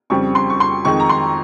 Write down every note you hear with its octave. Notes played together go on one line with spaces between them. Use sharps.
F2 C#3 G3 C4 C#6
C6
C#6
C6
F2 D#3 G#3 D#4 C#6
A#5
C6